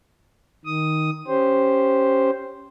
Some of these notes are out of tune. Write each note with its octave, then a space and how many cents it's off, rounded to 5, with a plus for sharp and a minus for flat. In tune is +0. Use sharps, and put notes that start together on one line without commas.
D#3 +10 D#6 +5
C#4 +0 G4 +0 C5 +0